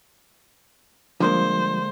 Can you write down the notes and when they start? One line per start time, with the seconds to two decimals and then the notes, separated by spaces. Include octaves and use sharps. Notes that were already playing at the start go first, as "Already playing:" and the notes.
1.20 D3 F3 G3 G#3 A#3 C5